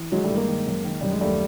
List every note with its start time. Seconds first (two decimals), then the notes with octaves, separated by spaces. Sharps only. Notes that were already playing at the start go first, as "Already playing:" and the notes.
Already playing: E3
0.12 D#3 F#3 G#3
0.24 G3 A3
0.30 G2
0.36 G#3 A#3
0.48 D#3
0.67 F#2
0.84 D#3
1.01 F#2 G3
1.11 G#3
1.21 D#2 G3 A3